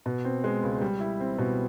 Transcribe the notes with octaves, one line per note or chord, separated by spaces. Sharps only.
B2
C4
G#3
C#2
G3
E4
C4
B2